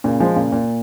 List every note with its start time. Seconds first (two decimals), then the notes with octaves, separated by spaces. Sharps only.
0.04 A#2 C#3
0.20 F3 G#3
0.36 A#2 C#3
0.52 A#2